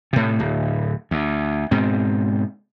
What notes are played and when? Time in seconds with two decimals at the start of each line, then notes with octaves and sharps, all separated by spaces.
0.13 A2 C3
0.39 D1
1.11 D2
1.71 G#2 B2 C4